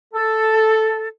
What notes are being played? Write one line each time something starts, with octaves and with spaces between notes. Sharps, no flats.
A4